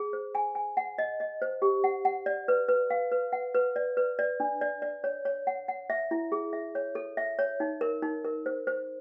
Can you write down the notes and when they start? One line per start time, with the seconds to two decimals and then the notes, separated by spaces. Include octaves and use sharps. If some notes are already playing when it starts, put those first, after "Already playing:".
Already playing: G#4
0.13 C5
0.35 G#5
0.55 G#5
0.77 F#5
0.98 D#5
1.20 D#5
1.42 C5
1.62 G4
1.84 F#5
2.05 F#5
2.26 D5
2.48 B4
2.68 B4
2.90 F5
3.12 B4
3.32 F#5
3.54 B4
3.76 D5
3.97 B4
4.19 D5
4.40 D4
4.61 D5
4.82 D5
5.04 C#5
5.25 C#5
5.47 F#5
5.68 F#5
5.90 E5
6.11 E4
6.32 G#4
6.53 E5
6.75 C#5
6.95 A4
7.17 E5
7.39 C#5
7.60 D#4
7.81 A#4
8.02 D#4
8.25 A#4
8.46 C5
8.67 C5